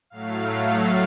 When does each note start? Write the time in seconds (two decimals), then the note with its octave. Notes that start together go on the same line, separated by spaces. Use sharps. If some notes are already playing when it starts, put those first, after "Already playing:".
0.10 A2 F#3 A3 F5
0.48 F5